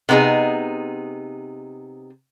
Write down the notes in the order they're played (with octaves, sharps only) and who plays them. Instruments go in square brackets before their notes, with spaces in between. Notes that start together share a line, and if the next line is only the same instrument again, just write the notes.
[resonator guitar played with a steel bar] C3 B3 D4 D#4 G#4